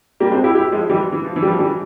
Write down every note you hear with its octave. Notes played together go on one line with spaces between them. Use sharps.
G3 A#3
G#3 C4
E4 G4
E4 G4
F3 G#3
E3 G3
E3
F3
E3
G3
F3
E3 G3